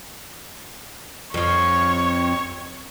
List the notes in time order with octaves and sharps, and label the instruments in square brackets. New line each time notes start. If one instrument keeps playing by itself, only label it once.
[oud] F2 F3 [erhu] C#5